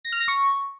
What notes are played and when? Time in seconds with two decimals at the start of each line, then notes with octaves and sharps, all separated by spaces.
0.05 A#6
0.12 F6
0.20 A#6
0.28 C#6